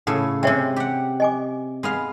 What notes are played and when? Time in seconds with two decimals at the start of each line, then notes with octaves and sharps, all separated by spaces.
0.07 A2 C#3 A4 F#5
0.43 C3 G#3 C#5 E5 G5
0.76 G4 F#5
1.20 D#5 G#5 D6
1.83 G#3 B3 F5